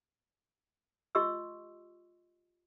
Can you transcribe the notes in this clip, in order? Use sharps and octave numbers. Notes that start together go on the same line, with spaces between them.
F4 G4 D#5 C6 C#6 E6